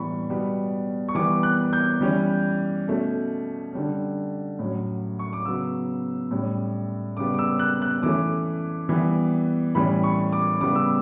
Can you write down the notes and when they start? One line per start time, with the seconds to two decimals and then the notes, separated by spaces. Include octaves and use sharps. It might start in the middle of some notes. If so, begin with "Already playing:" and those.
Already playing: A2 E3 G3 B3 B5 C#6
0.29 B2 G3 B3
1.08 C#6
1.15 E3 G3 B3 D6
1.43 F#6
1.73 G6
2.01 E3 G3 C#4
2.88 B2 A3 C#4
3.73 D3 G3 C#4
4.59 A2 F#3 C#4
5.19 C#6
5.33 D6
5.45 C#3 F#3 B3 E6
6.31 A2 G3 C#4
7.17 C#3 G3 B3 D6
7.34 D6
7.39 E6
7.59 F#6
7.82 F#6
8.03 E3 A3 C#4 D6
8.89 E3 G3 B3
9.75 A2 E3 G3 C#4 B5
10.03 C#6
10.32 D6
10.61 C#3 G3 B3 D6
10.75 E6